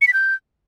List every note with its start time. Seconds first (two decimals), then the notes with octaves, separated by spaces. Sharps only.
0.01 C#7
0.07 B6
0.13 G6